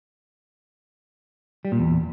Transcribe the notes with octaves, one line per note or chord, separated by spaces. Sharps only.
G3
A#2
E2